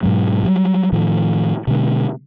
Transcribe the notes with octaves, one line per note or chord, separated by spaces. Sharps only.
G#2 B2 F#3 G#3
F#3 G3
A2 D#3 F3
B2 D3 G#3